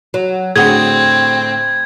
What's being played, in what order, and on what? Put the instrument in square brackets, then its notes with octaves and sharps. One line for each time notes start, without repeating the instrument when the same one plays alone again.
[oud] F#3
[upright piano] A2 D3 [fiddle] C4 [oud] F#4 G#4 [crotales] G#6